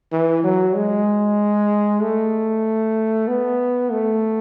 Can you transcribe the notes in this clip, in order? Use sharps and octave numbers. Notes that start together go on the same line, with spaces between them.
E3
F#3
G#3
A3
B3
A3